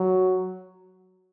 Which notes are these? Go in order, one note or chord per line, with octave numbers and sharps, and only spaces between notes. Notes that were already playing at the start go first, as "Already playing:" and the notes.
Already playing: F#3